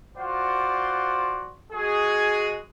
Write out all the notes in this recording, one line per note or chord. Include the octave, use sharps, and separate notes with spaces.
F4 F#4 C5 D5 F#5
G#3 F#4 G#4